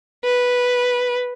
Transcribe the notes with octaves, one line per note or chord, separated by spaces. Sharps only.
B4